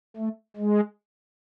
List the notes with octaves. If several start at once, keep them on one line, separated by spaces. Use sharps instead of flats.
A3
G#3